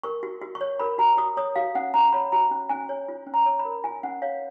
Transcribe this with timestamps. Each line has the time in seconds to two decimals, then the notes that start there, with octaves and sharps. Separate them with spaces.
0.04 A#4 C#6
0.23 F#4
0.42 F#4
0.55 C#6
0.61 C#5
0.79 A#4 B5
0.98 F#4 A#5
1.17 F#4 D#6
1.37 C#5 D#6
1.56 F#4 F5
1.75 C#4 F#5
1.94 C#4 A#5
2.12 C#5 B5
2.32 F#4 A#5
2.51 C#4
2.69 C#4 G#5
2.89 C#5
3.09 F4
3.27 C#4
3.34 A#5
3.46 C#5
3.59 B5
3.65 A#4
3.84 F4 G#5
4.03 C#4 F#5
4.22 C#5 F5